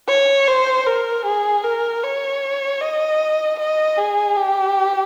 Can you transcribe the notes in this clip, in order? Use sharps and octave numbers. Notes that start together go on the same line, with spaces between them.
C#5
C5
A#4
G#4
A#4
C#5
D#5
D#5
G#4
G4